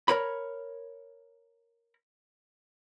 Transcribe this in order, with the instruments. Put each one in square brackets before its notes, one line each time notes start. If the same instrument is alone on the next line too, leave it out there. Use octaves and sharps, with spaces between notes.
[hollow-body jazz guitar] A#4 C#5 B5